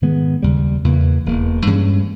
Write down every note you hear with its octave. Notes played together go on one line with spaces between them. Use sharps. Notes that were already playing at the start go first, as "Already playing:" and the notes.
G#2 D#3 G#3 B3
D#2 C#3 G3
E2 C#3 E3 A#3
E1 E2 B2 A#3
G2 E3 G#3 C#4